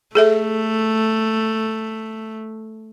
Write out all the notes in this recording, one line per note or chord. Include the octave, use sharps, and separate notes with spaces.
A3 G#4 A4 E5